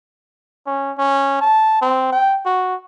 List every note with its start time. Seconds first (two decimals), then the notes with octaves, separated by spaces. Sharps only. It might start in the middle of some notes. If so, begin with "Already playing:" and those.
0.67 C#4
0.98 C#4
1.41 A5
1.81 C4
2.13 G5
2.46 F#4